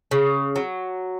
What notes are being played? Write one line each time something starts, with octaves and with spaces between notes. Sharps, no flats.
C#3
F#3